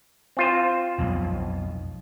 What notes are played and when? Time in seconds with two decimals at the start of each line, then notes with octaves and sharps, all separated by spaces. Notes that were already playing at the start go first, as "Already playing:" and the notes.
0.37 C4 F4 C5
0.98 B1 F2 B2